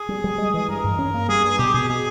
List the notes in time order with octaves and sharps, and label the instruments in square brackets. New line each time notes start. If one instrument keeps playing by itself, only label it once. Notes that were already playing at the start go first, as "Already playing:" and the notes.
Already playing: [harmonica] G#4
[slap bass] G3
G3
G#3
E3
[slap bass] G2 [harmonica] A#4
[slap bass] G2
C#4
A#3
[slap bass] G3 [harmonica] G#4
[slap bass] G2 [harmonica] G#4
[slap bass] B2 [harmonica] G4
[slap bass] B2 [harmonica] G#4
[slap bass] B2 [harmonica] G#4